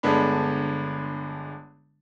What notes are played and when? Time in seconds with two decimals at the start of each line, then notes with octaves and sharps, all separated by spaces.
0.03 G1 D3 G#3 B3 D4 B5